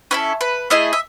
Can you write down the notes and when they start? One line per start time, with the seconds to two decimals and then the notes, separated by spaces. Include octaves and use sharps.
0.11 C#4 E4 A4 B4
0.41 B4
0.70 A3 E4 G#4 D#5
0.93 E5